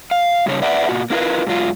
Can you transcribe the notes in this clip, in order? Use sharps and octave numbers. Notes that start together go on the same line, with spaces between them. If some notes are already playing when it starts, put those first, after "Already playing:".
F5
G2 C#3 C#5
B4 D5 E5 F#5
A#2 F#4
A#3 C4 E4 F4 A#4 B4
G#2 F#3 F4